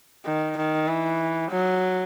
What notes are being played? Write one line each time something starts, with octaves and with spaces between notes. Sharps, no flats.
D#3
D#3
E3
F#3